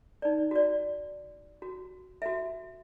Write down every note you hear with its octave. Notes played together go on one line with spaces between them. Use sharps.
D#4 D5
F#4 D5
F#4
F#4 E5